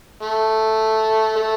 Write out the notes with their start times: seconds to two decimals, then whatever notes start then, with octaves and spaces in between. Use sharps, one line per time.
0.23 A3
1.36 A3